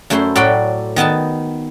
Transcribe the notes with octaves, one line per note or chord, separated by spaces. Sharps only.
F#2 A3 E4 C5 C6
A2 F#3 F#4 D5 G5 B5
D#3 B3 D#4 A5